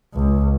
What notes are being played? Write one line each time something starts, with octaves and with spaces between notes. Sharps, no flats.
C#2